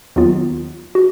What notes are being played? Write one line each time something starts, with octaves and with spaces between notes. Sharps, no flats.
D#2 D#3 F#3 B3 F4
F#4